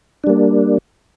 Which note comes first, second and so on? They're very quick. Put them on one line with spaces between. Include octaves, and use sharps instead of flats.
D4 G3 A#3